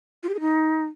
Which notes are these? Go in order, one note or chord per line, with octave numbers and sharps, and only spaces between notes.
F4
G4
G#4
D#4